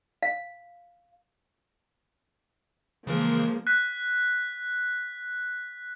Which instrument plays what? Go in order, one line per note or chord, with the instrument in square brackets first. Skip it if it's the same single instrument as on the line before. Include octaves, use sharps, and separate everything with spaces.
[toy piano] F5
[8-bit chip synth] C#3 E3 A#4 [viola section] F3 G#3 A#3
[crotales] F#6 B6